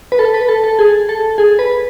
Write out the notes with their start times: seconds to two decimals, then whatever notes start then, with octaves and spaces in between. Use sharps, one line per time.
0.12 B4
0.19 A4
0.34 B4
0.49 A4
0.64 A4
0.79 G#4
1.09 A4
1.38 G#4
1.59 B4